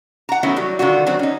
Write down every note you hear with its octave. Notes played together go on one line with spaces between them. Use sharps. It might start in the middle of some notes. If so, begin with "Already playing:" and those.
F#5 A#5
D#3 F#3 A3 B3 C#4 E4
F#3 G3
D3 D#3 G3 F4 F#4
D#3 F#3 G3 C4
C#4 D#4